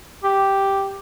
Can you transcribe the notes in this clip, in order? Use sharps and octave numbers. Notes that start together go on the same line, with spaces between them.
G4